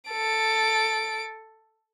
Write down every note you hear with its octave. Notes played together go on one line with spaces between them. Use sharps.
A4 D7